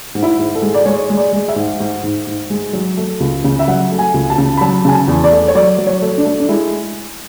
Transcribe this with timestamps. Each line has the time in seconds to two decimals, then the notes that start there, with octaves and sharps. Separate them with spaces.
0.15 G#2
0.23 E4
0.39 G#2
0.55 A4
0.62 G#3
0.74 D5
0.85 G#3 C#5
1.10 G#3
1.17 D5
1.33 G#3
1.48 E5
1.56 G#2
1.80 G#2
2.04 G#2
2.27 G#2
2.50 G#3
2.73 F#3
2.97 A3
3.20 C#2
3.44 C#3
3.59 E5
3.68 F#3 F#5
3.91 A3
3.98 G#5
4.14 C#2
4.30 A5
4.38 C#3
4.57 B5
4.61 F#3 A5
4.85 C#3 G#5
4.93 A5
5.08 E2
5.24 D5
5.31 A3
5.48 C#5
5.55 F#3 D5
5.78 F#3
5.87 C#5
6.02 A3
6.18 D4
6.25 A3
6.40 D4
6.49 G#3 E4